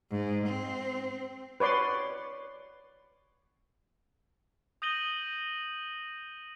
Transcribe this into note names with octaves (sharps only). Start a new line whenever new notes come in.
G#2
C4
B4 C#5 D5 C6
D#6 G6 A#6 D#7 F#7 G7